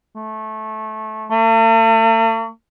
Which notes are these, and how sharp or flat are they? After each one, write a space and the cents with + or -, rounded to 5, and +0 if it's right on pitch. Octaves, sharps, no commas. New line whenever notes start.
A3 -15
A3 +45